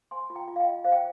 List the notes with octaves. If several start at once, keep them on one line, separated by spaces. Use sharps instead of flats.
C5 G#5 C6
F4
G5 A#5
F4
F5
D#5 G5
F4
C5 F5
G5